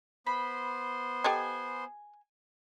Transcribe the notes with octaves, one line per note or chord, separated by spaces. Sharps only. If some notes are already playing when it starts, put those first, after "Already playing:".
B3 C5 B5 C6
G4 A4 D#5 G#5